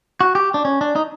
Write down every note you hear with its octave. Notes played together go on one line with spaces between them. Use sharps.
F#4
G4
D4
C#4
D4
D#4